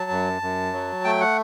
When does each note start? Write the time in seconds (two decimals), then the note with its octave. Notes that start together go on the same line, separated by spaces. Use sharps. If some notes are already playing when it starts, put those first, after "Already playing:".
Already playing: F#3 A5
0.11 F#2
0.42 F#2
0.73 F#3
1.05 A3 G5
1.21 F#5